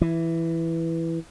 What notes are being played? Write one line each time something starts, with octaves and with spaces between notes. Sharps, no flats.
E3